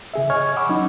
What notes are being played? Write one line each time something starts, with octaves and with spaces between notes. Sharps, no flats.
C#3 G#4 E5
C#5 D#5 G#5 C#6 F6 G#6
F#5 G#5 B5 C#6 D6 E6
F#3 C#4 D#4